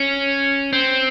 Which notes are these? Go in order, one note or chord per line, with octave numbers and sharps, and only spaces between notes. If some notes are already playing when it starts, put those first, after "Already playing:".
Already playing: C#4
C4